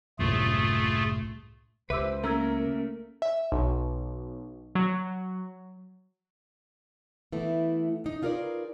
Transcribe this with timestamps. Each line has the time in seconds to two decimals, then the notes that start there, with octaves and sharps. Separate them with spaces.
0.19 F#1 C2 A2 A3 F4 G#4
1.90 C#2 G4 B4 C5 E5 D6 E6
2.24 A3 A#3 C#4 A#4 A#5 E6 G#6
3.22 E5
3.52 B1
4.75 F#3
7.32 E3 A3 B3 E4
8.04 D4 D#4
8.22 D#4 F4 G#4 A#4 B4 D5